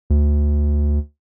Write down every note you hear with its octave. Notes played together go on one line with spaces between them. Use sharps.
D2